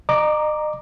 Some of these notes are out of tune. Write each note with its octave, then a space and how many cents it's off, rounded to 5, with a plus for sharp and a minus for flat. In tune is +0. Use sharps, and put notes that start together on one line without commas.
D#5 -40 A#5 +0 D6 +0